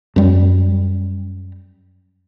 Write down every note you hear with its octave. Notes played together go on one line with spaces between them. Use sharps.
F#2 G3